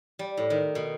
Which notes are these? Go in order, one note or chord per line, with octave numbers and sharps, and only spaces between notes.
G3
A2
D#3
B2